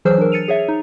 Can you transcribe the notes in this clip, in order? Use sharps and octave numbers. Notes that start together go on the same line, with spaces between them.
E3 F#3 G#4 C5 E6 F6
D4 A#4
A6 C#7 D#7 F7
G#4 C#5 E5
D#4